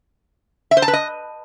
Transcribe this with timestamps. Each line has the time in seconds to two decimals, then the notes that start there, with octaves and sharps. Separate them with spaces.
0.71 E5
0.77 C5
0.82 A5
0.88 B4
0.93 D#5